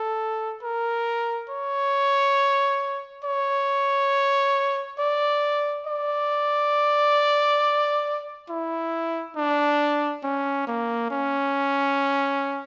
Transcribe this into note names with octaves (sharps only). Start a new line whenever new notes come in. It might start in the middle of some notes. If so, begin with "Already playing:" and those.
Already playing: A4
A#4
C#5
C#5
D5
D5
E4
D4
C#4
A#3
C#4